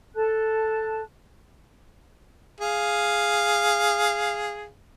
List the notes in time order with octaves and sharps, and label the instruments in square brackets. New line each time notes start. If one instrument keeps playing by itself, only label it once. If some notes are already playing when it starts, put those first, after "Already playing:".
[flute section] A4 A5 F#6
[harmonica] G#4 F5